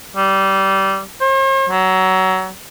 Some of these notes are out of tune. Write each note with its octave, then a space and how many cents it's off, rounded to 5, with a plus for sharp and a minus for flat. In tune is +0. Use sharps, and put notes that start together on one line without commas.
G3 -20
C5 +45
F#3 +20